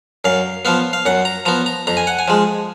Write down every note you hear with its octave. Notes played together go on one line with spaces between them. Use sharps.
F#2 F5
F3 B3 F5
F5
F#2 F#5
A#5
F3 B3 A#5
A#5
F2 A#5
G#5
F#5
G#5
F3 G#3